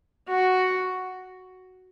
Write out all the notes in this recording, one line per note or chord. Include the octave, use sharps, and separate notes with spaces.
F#4